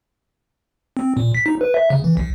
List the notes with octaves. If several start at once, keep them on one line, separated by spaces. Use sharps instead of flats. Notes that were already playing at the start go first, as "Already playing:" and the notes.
C4
A#2
B6
D#4
B4
E5
C#3
E3
B1